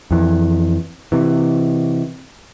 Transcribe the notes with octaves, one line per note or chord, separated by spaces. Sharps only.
F2 E3
C3 E3